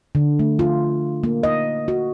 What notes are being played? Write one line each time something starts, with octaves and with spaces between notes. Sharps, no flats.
D3
A3
F4
A#3
D#5
F#4